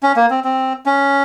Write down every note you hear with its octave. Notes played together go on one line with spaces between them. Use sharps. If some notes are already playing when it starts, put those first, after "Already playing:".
C#4
A#3
C4
C4
C#4